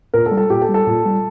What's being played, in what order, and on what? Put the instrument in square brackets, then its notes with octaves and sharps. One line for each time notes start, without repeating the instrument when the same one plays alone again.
[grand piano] A#2 A#4
A4
G3
A4
A#2 G4
A4
G3
A4
A#2
G3